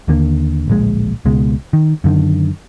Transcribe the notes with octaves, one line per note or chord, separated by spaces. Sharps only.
D#2 D3 A#3
D1 A#1 G#3
C#2 B2 G#3
D#3
F#2 D3 D#3